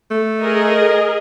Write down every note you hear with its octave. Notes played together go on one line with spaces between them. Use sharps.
A3
G#4 A#4 D#5